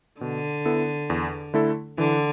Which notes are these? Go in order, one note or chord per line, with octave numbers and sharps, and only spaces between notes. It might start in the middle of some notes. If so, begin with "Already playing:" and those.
B2 D3
B3 E4 A4
E2
D3 A3 E4 A4
D3 E3